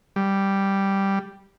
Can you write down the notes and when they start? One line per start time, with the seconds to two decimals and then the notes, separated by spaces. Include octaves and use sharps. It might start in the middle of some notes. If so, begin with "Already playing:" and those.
0.16 G3